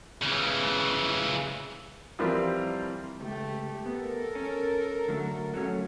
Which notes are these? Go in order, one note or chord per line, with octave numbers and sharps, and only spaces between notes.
C#3 E3
E3 F3 G3 C4 F4 A#4
C#2 A3 G4
B3 A4 A#4
C#4
D3 F#3 A3
F#3 A3 C#4